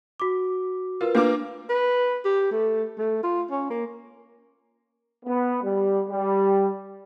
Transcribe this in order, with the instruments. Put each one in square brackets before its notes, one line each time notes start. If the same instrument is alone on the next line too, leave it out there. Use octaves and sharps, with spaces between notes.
[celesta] F#4 D6
[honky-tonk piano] F4 [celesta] A#4 B4
[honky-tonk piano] A#3 F4 D6 [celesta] D4 B4
[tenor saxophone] B4
G4
A3
A3
F4
C#4
A#3
[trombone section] B3
G3
G3